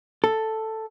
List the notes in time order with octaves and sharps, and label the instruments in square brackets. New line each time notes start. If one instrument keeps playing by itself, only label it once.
[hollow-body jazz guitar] A4